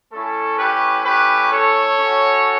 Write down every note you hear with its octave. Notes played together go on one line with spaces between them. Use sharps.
A3 C#4 E4 A4
G4 B4
G4 B4
A4 C#5
C#4 F#4